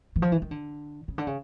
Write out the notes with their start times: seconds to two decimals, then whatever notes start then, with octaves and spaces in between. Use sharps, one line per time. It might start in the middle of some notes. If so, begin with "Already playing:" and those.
0.16 E3
0.22 F3
0.32 E3
0.42 D#3
0.51 D3
1.08 C#3
1.18 D3
1.27 C#3